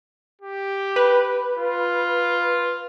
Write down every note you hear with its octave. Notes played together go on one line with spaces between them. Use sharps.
G4
B4
F4